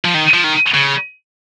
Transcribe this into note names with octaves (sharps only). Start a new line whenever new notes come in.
F3
D#3
F3
D#3
C#3